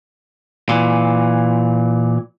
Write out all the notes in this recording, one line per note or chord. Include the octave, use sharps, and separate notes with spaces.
A#2 E3